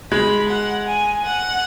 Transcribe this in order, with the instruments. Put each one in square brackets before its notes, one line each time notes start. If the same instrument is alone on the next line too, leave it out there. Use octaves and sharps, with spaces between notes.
[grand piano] G#3 [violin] B5
[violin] F#5
G#5
F#5